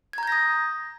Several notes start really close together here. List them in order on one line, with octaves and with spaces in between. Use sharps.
G#6 A#5 G6 A#6 D#6